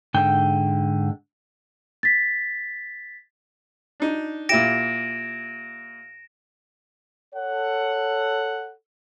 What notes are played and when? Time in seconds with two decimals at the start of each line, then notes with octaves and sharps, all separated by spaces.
0.14 G#2 D3 G5
2.03 A6 B6
4.00 D4 D#4
4.49 A#2 E4 G4 A#6 D7 E7
7.35 A4 C#5 F#5